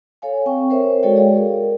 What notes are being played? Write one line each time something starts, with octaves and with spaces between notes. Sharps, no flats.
A4 C#5 F5 G#5
C4 G5 C#6
A#4 C5 C#5 E5
G#3 F#4 A4 C#5 D5 G5
G#4 D5 F5
A#4